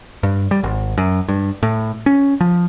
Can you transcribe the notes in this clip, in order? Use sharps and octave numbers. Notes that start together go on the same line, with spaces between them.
G2
G3
G#1
F#2
G2
A2
C#4
F3